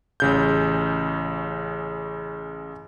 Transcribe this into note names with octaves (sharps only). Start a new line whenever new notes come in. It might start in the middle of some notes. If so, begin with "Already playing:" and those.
A1 C#3 G6